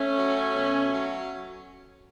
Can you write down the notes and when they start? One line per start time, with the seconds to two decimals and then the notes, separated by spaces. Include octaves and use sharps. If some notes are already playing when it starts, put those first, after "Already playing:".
Already playing: A3 C#4
0.17 F#3
0.54 B2
0.92 F#3